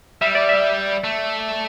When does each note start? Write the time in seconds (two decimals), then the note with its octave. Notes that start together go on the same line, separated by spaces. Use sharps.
0.21 G3 E5
0.35 D5
0.49 E5
1.04 A3